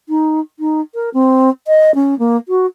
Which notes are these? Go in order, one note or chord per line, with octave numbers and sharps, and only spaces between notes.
D#4
D#4
A#4
C4
D#5
C#4
A#3
F#4